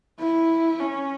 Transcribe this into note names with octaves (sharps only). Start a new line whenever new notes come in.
E4
C#4